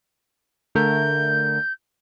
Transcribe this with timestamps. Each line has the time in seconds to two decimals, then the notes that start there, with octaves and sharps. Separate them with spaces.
0.75 D3 A3 A#4 G6